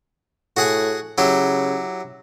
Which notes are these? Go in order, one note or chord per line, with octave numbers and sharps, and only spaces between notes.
A2 F#4 G#4 F#5
C#3 F#3 E4 G4